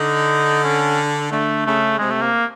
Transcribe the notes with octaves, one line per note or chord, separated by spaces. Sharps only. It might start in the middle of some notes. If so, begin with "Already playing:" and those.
Already playing: D3 D#4
C#4
D3 A3
C#3 A3
C3 G#3
A3
A#3